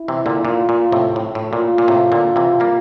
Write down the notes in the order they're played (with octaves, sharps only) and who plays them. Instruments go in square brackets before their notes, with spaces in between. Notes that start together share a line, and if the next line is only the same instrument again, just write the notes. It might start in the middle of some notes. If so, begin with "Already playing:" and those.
Already playing: [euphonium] E4
[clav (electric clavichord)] C3 E3
A#2 D3
[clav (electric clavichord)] A#2 [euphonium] F4
[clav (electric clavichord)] A#2
A2 C3
A2
A2
[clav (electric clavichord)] A#2 [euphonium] F4
[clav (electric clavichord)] A#2
A2 C3
A#2 D3
C3 E3
G3 A#3